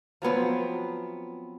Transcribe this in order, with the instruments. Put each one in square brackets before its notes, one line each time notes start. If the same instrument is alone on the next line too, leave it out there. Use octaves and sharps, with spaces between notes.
[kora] F3 F#3 B3 C4